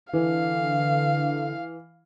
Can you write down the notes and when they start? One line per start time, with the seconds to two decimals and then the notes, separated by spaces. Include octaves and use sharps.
0.13 D3 E3 F5